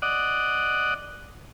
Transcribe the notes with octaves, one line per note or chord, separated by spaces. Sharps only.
D5 D#5 F#5